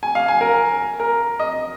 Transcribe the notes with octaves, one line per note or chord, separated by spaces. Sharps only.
G#5
F5
G#5
A#4
A#4
D#5